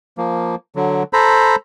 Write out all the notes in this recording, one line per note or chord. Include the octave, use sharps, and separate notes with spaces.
F3 A#3
D3 F#3
A4 C5 A#5 B5